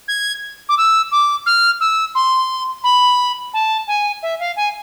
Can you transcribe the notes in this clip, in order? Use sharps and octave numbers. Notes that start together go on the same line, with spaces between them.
G#6
D6
E6
D6
F6
E6
C6
B5
A5
G#5
E5
F5
G#5